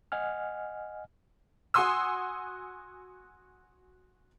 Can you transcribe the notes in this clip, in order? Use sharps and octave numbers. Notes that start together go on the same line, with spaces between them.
D#5 F#5 G#5 F6
F#4 F#5 G#5 C6 D#6 E6